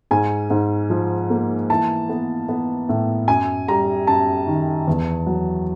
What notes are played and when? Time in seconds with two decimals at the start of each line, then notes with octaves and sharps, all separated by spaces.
0.11 G#2 G#5
0.50 G#2
0.90 F3
1.30 A#3
1.70 E3 A5
2.09 B3
2.48 B3
2.89 A2
3.28 F#2 G#5
3.68 G3 A#5
4.07 F#2 A5
4.47 D#3
4.87 E2
5.26 F#3